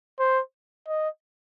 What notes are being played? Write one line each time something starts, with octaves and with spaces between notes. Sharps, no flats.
C5
D#5